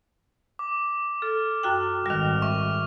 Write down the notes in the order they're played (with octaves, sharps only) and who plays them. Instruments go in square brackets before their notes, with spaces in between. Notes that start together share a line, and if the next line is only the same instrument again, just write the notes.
[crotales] D6
[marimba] A4 [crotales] F6
[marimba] F#2 F#4 G5
[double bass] G#1 [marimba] D#3 G3 [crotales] F6 F7
[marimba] E5 [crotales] C#6